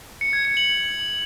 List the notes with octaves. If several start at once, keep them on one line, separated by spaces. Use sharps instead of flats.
C#7
G#6
C#7
F#7